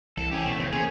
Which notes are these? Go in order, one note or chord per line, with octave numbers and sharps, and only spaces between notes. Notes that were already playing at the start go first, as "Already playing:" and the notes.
C2 E3 A4
C#4 G4 G#4
B2 A3
F2 A2 C#3 C5
A#3 C#4 G#4